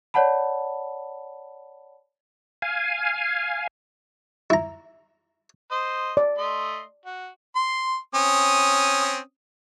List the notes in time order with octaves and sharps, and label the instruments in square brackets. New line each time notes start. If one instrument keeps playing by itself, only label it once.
[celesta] C#5 D5 F#5 A5 B5
[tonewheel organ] F5 G#5
[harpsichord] E4 A#5
[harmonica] C5 D#5
[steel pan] D5
[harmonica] A3 D#5 C6
F#4
C6
C4 C#4 D#6